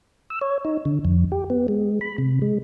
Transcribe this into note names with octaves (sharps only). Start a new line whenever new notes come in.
E6
C#5
D#4
D3
F2
G4
B3
G#3
B5
C3
G#3